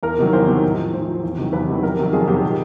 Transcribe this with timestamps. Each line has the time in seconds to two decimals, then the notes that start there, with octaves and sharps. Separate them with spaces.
0.03 E2 A#4
0.18 C3 D#3 F#3
0.33 E2 C5
0.48 C3 D#3 F#3
0.63 A2
0.79 F3
0.93 A2 C5
1.08 F3
1.23 E2
1.38 C3 D#3 F#3
1.53 E2 B4
1.68 C3 D#3 F#3
1.83 F2 A#4
1.99 C3 D#3 F#3
2.13 F2 G#4
2.28 C3 D#3 F#3 G4
2.44 A#2